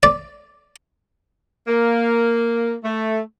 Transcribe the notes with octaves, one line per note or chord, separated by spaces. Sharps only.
D5
A#3
A3